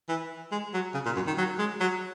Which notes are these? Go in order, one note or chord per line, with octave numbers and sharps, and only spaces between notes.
E3
G#3
F#3
C#3
A#2
F#2
D#3
F#3
G#3
F#3